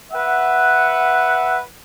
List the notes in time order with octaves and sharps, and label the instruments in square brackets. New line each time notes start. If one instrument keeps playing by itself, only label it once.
[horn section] B4 E5 F#5